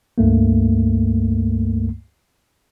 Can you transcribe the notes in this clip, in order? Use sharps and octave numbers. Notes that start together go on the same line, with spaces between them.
C#2 G2 A3 A#3